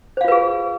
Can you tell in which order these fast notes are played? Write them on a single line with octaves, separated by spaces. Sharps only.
C5 F5 F4 B4 G#4